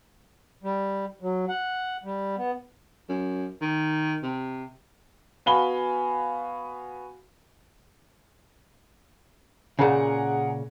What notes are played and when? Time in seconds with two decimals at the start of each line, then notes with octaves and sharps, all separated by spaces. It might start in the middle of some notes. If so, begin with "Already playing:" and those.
0.63 G3
1.22 F#3
1.48 F#5
2.04 G3
2.37 B3
3.09 F#2
3.61 D#3
4.23 C3
5.46 B3 F#4 F5 G#5 B5 G7
9.79 A#2 C#3 G#4 A#4 F#5